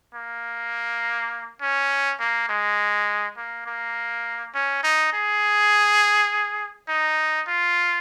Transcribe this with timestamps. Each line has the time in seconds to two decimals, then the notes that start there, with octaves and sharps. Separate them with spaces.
0.15 A#3
1.62 C#4
2.20 A#3
2.49 G#3
3.37 A#3
3.66 A#3
4.55 C#4
4.84 D#4
5.13 G#4
6.89 D#4
7.48 F4